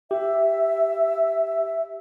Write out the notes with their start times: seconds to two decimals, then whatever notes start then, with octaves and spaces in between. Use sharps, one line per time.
0.11 G4 E5